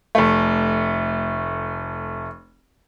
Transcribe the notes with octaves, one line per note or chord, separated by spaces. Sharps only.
F1 A3